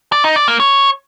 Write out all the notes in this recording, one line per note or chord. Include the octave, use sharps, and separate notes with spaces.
D5
D#4
D5
A#3
C#5